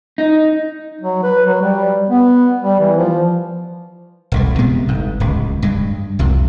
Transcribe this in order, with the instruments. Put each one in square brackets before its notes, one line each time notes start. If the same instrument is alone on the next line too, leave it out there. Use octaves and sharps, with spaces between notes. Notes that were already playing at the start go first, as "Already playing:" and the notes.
[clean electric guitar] D#4
[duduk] F#3
B4
F#3
G3
B3
G3
E3
F3
[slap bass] E1 C2 A2
C3 G3 G#3 B3
G1 G#2
D1 C#2
G2 G#3
C2 F2 C3